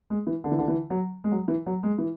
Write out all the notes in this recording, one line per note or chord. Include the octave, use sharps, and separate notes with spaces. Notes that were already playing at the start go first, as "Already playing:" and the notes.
G#3
E3
D3
E3
D3
E3
F#3
G#3
F#3
E3
F#3
G#3
E3